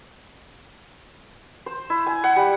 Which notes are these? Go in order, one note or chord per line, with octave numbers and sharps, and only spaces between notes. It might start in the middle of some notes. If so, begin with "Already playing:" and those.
C5
E4
G#5
F#5
G3